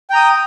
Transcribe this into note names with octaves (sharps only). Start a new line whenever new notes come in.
G5 A#5 D#6